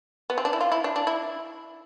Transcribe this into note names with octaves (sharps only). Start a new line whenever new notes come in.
B3
C4
D4
E4
F4
E4
D4
D4
E4